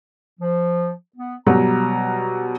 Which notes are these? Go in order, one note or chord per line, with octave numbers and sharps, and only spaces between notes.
F3
B3
B2 F#3 G3 A#5